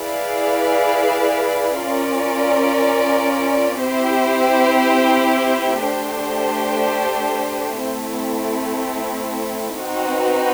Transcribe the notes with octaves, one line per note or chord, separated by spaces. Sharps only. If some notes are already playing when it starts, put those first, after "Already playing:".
Already playing: E4 G#4 B4 D5 F5
C#4 F4 A#4 D5
C4 E4 G4 C5
A3 D4 G4 C5
A3 C4 E4
C4 D#4 F#4 B4